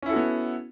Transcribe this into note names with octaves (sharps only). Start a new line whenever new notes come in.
B3 C#4 E4 F#4 A4